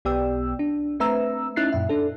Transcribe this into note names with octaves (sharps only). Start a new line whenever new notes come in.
B1 B3 G4 D5 G5 E6
D4
A3 C4 B4 E5 A#5 E6
C#4 D#4 E4 F#6 A6 C7
F#2 A#2 E5
D4 A4